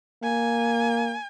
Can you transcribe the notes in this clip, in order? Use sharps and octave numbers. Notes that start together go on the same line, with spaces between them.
A#3 G#5